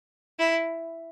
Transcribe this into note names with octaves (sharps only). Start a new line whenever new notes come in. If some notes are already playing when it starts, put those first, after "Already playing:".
E4